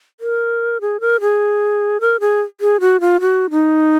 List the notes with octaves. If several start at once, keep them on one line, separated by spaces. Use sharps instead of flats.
A#4
G#4
A#4
G#4
A#4
G#4
G#4
F#4
F4
F#4
D#4